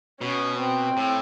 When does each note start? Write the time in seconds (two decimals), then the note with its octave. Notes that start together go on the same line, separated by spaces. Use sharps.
0.21 B2 C#4
0.59 C4
0.97 A2